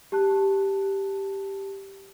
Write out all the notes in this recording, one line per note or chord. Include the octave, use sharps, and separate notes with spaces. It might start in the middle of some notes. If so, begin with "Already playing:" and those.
G4 A5 F#6